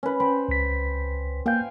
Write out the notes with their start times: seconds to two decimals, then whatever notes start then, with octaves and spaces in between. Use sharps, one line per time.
0.03 C#4 B4
0.20 C5 G5 B5
0.49 C#2 B6
1.46 A#3 F5 G5 G#5 G6